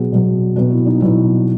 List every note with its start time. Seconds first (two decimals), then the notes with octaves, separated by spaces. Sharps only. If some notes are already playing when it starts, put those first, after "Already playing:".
Already playing: B2 F#3 B3 F#4 G#4
0.12 B2 F#3 B3
0.56 B2 F#3 B3 F#4
0.71 E4
0.86 D#4
1.01 B2 F#3 B3 E4